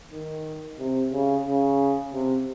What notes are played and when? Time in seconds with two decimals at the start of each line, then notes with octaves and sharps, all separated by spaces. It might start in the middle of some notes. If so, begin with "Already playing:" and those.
0.11 D#3
0.79 C3
1.12 C#3
1.45 C#3
2.13 C3